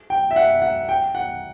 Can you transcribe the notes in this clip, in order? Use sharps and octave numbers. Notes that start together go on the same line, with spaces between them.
G5
E5
F#5
F#5
G5
F#5